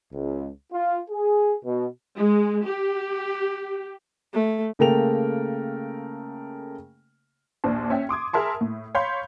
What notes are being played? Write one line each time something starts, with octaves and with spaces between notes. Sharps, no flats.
C#2
F4
G#4
B2
G#3
G4
A3
C#3 A3 A#3 A#4 G5 F7
A#1 D#2 D4 C5 A5
C#4 E5 G5
C6 D6 D#6 G#6
G#4 A#4 E5 A5 C6
A2
C#5 F5 B5 C6 G6 B6